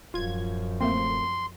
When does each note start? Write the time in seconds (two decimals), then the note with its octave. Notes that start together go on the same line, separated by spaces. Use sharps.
0.14 D1 F#2 F3 F4 G#6
0.81 A3 A#3 C4 C6